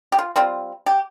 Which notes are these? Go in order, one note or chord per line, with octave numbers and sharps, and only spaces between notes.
G4
F4
G3 C4 F4
G4